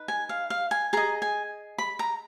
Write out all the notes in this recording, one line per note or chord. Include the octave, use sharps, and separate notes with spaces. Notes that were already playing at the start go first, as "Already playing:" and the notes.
Already playing: D#4 B4
G#5
F5
F5
G#5
G#4 D#5 A#5
G#5
B5
A#5